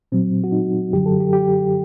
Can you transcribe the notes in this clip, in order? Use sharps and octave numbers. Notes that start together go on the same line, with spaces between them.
A#2 F#3 C4
F#4
D#4
F#2 D3 F#3 G4
A4
G4
G4